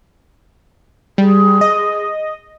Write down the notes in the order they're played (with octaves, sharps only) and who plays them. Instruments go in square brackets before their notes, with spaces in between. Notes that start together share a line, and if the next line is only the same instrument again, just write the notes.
[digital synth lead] G3 [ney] G#4
[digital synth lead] D#5